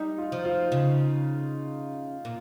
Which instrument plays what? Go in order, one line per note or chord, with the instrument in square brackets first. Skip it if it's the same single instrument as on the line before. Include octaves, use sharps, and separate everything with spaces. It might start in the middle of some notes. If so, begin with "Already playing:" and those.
Already playing: [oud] G3 [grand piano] D#4
[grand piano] F4
[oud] F3
[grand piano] F4
[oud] C#3
A#2